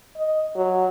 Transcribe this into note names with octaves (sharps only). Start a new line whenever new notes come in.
D#5
F#3